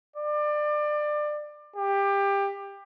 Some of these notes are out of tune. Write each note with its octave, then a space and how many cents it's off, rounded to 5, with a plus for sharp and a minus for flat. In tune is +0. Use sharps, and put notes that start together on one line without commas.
D5 +25
G4 +20